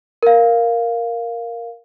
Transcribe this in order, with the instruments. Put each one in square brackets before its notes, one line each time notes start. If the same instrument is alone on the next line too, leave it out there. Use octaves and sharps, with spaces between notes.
[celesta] A#4 F5